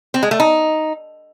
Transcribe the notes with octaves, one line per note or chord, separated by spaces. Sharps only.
C4
G#3
A3
D#4